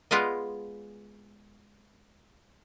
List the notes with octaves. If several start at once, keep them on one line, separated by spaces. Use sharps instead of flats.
G#3 B3 F4 G#4 D5 D#5